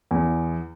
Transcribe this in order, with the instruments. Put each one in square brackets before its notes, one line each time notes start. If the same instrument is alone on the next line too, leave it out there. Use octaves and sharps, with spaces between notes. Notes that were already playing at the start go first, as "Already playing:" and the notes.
[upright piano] E2